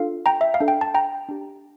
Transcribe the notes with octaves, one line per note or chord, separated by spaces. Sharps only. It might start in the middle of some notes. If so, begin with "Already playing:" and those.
Already playing: D4 F4 A4 F5
G5 A#5
E5
F5
D4 A4
G5
A5
G5 A#5
D4 G4